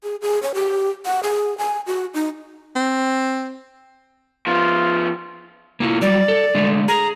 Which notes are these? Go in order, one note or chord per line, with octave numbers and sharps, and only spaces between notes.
G#4
G#4
C#5
G4
F#5
G#4
G#5
F#4
D#4
C4
F3 B3 F4
A#3 E4 F4
F#3 G3 D5
A4
D3 G#3 A3
G#4 A#5